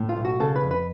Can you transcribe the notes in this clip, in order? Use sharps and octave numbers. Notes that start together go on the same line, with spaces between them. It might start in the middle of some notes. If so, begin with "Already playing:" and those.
Already playing: A2
F4
B1
F#4
C#3 A4
B4
F2
B4